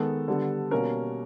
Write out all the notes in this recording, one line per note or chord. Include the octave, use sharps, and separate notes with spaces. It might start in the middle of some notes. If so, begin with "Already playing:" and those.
Already playing: D#3 G#3 B3 A4
D3 G3 B3
B2 G3 A#3 C#4 A#4